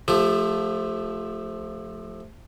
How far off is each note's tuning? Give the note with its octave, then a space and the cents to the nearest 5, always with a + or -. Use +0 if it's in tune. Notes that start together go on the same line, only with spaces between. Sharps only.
F3 +10 A3 -5 G4 +35